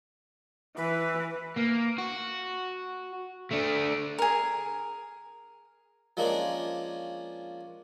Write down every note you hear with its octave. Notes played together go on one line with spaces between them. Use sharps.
E3 B4
A#3
F#4
A3 D4
G#4 A#4
F3 G#3 A#3 C#4 D4